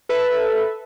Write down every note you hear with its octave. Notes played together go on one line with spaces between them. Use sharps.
A4 B4 E5